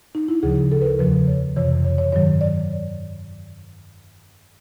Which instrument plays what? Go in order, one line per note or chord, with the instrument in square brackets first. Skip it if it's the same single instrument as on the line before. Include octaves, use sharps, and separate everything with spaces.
[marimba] D#4
E4
D2 C#3 F3 G#4
A4
B4
A#4
E2 C#3 F3 B4
C#5
F2 C3 E3 C#5
C#5
C#5
G2 D#3 F#3 C#5
D5